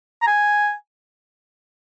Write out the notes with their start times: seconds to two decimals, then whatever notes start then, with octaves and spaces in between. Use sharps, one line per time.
0.22 A#5
0.27 G#5